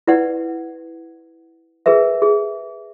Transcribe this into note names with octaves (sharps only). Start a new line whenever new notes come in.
E4 B4 D5 F#5
G#4 A#4 B4 E5
G#4